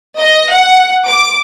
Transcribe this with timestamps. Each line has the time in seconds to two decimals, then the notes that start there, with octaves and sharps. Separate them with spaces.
0.19 D#5
0.50 F#5
1.07 D6